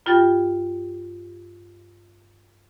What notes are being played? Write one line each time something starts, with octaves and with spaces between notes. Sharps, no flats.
G2 F4 G4 G5 A6